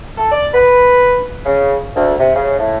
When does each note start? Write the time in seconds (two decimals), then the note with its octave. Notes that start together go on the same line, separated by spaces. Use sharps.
0.17 A4
0.32 D5
0.53 B4
1.46 C#3
1.95 D2
2.18 C3
2.35 C#3
2.59 A2